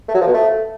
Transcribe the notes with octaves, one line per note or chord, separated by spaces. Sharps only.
A3
F#3
F3
B2
A3